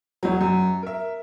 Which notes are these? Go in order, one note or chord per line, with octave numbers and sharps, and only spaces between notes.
E1 F#3
F#2
A#4 E5